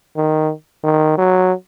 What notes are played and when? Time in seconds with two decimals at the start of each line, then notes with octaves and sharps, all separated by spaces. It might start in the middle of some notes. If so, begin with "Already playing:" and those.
0.17 D#3
0.84 D#3
1.18 F#3